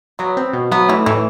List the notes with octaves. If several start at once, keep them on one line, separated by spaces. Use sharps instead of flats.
F#3 B3
C4
B2
F#3 B3
E3 A3
A2 E3